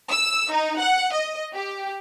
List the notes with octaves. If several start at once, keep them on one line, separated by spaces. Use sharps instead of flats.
E6
D#4
F#5
D#5
G4